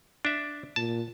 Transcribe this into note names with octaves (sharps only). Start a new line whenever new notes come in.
D4 E5
A#2 A5